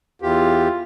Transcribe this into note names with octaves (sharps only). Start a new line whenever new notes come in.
E2 F4 G4